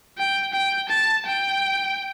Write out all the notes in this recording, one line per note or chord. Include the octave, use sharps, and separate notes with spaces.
G5
G5
A5
G5